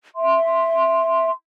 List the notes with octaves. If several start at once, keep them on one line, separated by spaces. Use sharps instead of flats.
E5 C6